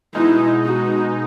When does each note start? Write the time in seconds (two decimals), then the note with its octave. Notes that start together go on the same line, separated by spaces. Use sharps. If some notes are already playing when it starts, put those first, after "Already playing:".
0.15 B2 G#3 D#4 E4
0.65 F#4